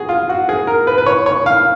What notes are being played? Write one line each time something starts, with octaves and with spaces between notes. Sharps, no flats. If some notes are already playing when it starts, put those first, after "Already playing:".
Already playing: F#4 G#4
F4
F#4
G#4
A#4
B4
B4
C#5
C#5
F5